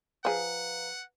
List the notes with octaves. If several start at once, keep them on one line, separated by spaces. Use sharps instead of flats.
F3 G#4 B4 F5 F#5 A#5